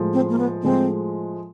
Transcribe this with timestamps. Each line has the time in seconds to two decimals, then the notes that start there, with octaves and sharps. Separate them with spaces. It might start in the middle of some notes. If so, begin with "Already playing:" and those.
Already playing: A2 F3 G#3
0.13 C4
0.30 A#3
0.38 B3
0.63 A2 F3 G#3 C4